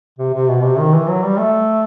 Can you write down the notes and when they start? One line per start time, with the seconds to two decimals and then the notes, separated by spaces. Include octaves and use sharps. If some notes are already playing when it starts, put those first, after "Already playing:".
0.19 C3
0.34 C3
0.48 B2
0.63 C3
0.79 D#3
0.93 E3
1.09 F#3
1.24 G3
1.39 A3